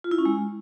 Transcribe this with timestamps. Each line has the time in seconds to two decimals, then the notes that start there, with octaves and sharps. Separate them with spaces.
0.04 F4
0.11 E4
0.18 C#4
0.25 G#3